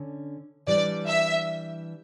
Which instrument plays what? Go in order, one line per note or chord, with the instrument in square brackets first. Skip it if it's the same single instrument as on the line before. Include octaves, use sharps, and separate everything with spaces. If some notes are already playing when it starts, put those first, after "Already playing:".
Already playing: [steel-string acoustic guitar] D3 C#4
[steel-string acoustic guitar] E3 G3 D4 [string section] D5
[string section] E5